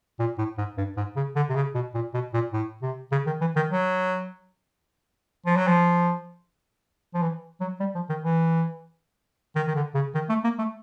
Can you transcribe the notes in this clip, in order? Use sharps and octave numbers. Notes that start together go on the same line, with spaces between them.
A#2
A2
G#2
G2
G#2
C#3
D3
C3
C#3
B2
A#2
B2
A#2
A2
C3
C#3
D#3
E3
D#3
F#3
F3
F#3
F3
F3
E3
F#3
G3
F3
D#3
E3
D#3
D#3
D3
C#3
D#3
A3
A#3
A3